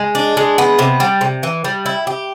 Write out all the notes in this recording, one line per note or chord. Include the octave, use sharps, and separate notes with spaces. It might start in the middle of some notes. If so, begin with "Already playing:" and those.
Already playing: G#3
D4
G#3
B3
C3
G3
C3
E3
G3
E4
G4